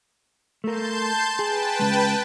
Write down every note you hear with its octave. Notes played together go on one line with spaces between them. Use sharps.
A3 A#4 A5 C6 G6
G#4 B4 G5 A5
C#2 C#3 G#3